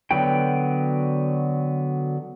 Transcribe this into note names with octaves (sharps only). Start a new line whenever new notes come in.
D3 F#3 B3 F#4 G5